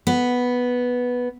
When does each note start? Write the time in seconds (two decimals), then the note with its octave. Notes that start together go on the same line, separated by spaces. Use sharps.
0.07 B3